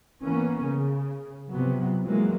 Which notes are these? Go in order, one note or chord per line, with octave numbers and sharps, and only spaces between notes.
E3 A#3 B3 C#4
C#3
C3 F3 F#3 B3
E3 F#3 G#3 A#3